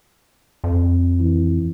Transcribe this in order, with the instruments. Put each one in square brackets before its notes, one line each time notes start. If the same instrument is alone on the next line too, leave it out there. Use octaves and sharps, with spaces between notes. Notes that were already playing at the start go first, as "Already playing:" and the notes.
[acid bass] F2
[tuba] E3